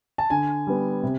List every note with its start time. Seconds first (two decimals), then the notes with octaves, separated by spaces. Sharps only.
0.18 A5
0.30 D3 G#5
0.67 G3 B3
1.03 C3